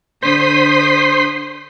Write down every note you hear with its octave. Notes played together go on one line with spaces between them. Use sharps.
D3 C5 C6 D#6 B6